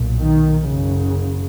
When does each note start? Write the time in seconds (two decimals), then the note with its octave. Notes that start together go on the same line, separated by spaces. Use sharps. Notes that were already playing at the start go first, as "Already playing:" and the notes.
Already playing: B1 A#2
0.21 D#3
0.67 F#1 F#2 C#3